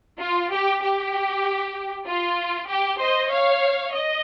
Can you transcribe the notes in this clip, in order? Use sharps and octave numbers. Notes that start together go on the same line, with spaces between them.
F4
G4
G4
F4
G4
C5 D#5
C#5 F5
D#5